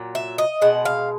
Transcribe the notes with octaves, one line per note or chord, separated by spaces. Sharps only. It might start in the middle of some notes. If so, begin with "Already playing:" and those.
Already playing: A#2 F#3
E5
D#5
B2 G#3 F#5
F5